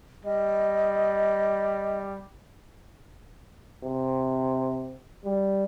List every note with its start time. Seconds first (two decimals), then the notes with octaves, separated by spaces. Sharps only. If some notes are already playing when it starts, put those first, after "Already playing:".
0.25 G3 D#5
3.84 C3
5.25 G3